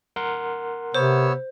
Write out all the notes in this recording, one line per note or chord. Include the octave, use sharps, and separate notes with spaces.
A#4 F#5 C6
C3 B3 C5 C#5 E6